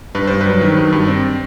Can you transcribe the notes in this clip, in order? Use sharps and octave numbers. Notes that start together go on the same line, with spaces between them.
G2 B4
G2 C5
F#3 B4
D#3
G2
G2
C4